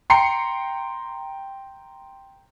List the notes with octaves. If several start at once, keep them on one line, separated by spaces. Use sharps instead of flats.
G5 A#5 C6 C7 C#7